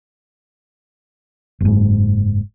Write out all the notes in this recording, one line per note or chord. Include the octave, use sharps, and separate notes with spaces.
F#1 G#2